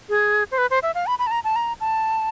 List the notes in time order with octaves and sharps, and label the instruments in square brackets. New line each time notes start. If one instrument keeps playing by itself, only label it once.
[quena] G#4
C5
B4
C5
E5
F5
B5
B5
A5
A#5
A5
A#5
A5